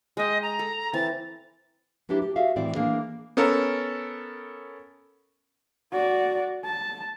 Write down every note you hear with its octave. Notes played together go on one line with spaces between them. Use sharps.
G#3 D#5 G5
A#5
A4
E3 C4 A6
F#3 B3 D4 E4 G4
G4
F#4 G#4 E5 F5
A2 E3 B3 C4 D5
E3 A#3 D4 G#4
B3 C#4 A4 A#4
F#4 D5
A5